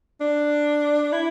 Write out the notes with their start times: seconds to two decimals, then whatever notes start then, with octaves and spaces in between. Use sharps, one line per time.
0.21 D4
1.13 E4